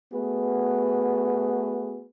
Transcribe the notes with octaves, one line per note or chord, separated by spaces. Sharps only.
A3 B3 F#4 G#4 B4